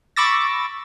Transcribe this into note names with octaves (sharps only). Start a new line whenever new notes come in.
B5 C#6 D6 E6 A6 A#6